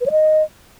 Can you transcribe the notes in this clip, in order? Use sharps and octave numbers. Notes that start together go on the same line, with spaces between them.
B4
C#5
D#5